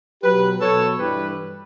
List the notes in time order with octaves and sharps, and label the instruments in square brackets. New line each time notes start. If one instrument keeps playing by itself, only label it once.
[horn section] B2 F#3 G4 B4
B2 F#3 A4 C#5
G2 E3 G3 G4 B4